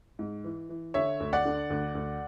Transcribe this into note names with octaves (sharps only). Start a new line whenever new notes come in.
G#2
E3
E3
D3 C#5 E5
D2
D5 F#5
D3
D2
D2